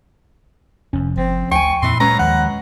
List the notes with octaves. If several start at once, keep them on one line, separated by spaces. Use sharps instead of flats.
F1 F2 C#4
G1 F3 C4
D2 G5 G#5 C#6
F2 A#2 E3 C4 C6
F#3 G#3 C#4 B4 A#5
D#2 F3 F#5